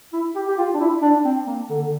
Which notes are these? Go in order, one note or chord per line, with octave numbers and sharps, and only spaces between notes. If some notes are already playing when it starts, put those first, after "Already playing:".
E4
G4
G4
F4
D4
E4
D4
C4
A#3
D3
D3